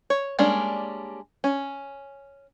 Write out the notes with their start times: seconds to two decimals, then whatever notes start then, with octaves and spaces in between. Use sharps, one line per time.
0.10 C#5
0.39 G3 G#3 A#3 C#4 D4
1.44 C#4